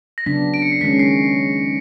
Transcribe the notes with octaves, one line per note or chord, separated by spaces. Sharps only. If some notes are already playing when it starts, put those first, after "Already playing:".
A#6
C#3 F#3 B3 D4 B6
D7
C#7
C7
D#3 G#3 C#4 B6
C7